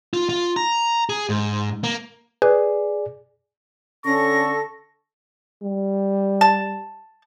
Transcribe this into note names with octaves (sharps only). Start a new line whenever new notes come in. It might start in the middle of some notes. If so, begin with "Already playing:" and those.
F4
F4
A#5
G#4
G#2
A#3
G#4 B4 D5
D3 C#4 A4 C#6 A#6
G3
A5